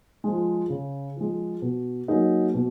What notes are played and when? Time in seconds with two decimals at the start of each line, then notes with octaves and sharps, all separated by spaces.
0.24 F3 G#3
0.70 C#3
1.16 F3 G#3
1.62 B2
2.08 F#3 A#3 D#4 G#4
2.54 B2